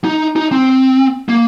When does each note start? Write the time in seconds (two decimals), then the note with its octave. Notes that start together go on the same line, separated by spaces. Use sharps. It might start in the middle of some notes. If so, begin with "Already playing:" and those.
0.04 D#4
0.36 D#4
0.51 C4
1.29 A#3